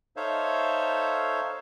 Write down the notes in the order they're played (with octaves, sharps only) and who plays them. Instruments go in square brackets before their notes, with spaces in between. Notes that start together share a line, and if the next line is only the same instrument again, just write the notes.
[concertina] D#4 A4 C5 C#5 E5 F5